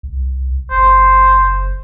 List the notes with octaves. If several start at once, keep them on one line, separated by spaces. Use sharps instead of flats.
C2
F#1 C5